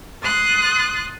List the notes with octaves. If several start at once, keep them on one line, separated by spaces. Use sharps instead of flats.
C6 D#6 F#6 A6